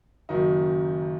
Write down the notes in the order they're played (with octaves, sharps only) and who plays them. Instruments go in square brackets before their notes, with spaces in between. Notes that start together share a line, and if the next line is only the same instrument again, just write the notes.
[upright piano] F#1 F#2 D#3 F#3 D#4